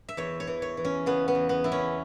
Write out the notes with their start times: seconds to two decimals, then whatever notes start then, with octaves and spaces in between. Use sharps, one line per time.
0.09 E5
0.17 E2 C#5
0.40 C#5
0.47 E3
0.62 C#5
0.77 E3
0.85 C#4
1.06 C#3 B3
1.28 B3
1.35 E2
1.49 B3
1.64 E3 E4
1.72 C#4